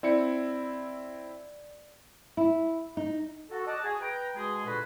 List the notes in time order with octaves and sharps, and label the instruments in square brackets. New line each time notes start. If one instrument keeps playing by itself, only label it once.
[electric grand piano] C4 E4 C#7 [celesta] D5
[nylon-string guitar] E4
D#4
[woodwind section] F#4 A4
D5 D#5 F#5 A5
F#4 G#4
B4 G5 A#5
B2 G#3 G#4 C6
D2 A#2 F#4 B4